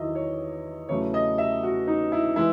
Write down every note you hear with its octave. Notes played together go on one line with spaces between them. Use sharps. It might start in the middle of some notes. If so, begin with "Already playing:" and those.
Already playing: E2 D#3 F#3 E4 D#5
C#5
E2 C#3 F#3 A3 C#5
D#5
E5
F#4
D#4
E4
E3 G#3 E4